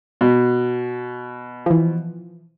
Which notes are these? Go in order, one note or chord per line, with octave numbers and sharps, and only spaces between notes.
B2
E3 F3